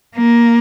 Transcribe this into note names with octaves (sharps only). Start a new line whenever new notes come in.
A#3